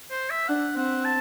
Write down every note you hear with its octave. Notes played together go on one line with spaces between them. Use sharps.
C5
E5
D4 F#5
C4 F#5
A5